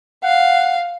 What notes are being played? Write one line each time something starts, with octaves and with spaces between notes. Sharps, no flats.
F5 F#5